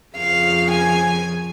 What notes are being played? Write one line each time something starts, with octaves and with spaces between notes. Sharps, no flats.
F2 C#3 F3 F5
G#5